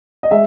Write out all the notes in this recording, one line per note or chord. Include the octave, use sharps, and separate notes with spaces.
D#5
G#3 E5